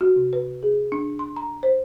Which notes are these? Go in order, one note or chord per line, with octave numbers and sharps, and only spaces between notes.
F#4
C3
B4
G#4
D4
C6
A#5
C5